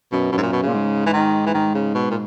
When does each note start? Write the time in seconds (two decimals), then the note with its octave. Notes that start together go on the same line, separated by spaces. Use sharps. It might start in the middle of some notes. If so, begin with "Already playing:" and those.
0.12 F#2 B2
0.32 F#2 B2
0.38 G#2
0.43 A#2
0.52 B2
0.63 A#2 C#3
0.74 G#2
1.06 E3
1.13 D#3
1.46 E3
1.54 G#2 D#3
1.75 C#3
1.95 B2
2.11 A#2